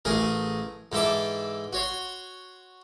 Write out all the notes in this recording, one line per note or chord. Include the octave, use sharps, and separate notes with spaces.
A1 A3 G#4 A#4
G#2 E3 A4 E5 D6
F#4 C#5 C6